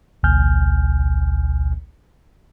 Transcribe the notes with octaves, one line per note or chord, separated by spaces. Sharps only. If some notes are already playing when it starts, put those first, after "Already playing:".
A1 D2 B2 G#5 F6 G6